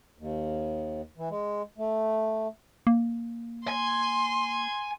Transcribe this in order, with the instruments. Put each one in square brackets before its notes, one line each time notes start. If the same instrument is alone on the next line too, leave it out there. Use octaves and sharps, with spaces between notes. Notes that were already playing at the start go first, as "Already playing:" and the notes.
[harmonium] D#2
E3
G#3
A3
[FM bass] A#3
[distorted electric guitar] G#5 [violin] C6